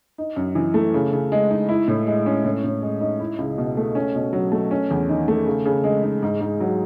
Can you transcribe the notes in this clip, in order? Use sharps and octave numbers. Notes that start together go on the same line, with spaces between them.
D#4
F#2
E3
A3
C#3
C#3
G#3
D#4
E4
A2
G#3
C#4
A2
A2
G#3
D#4
E4
C#2
B2
A3
C#4
B2
F#3
A3
C#4
E2
D#3
A3
C#3
C#3
G#3
D#4
G#2
G#2
F#3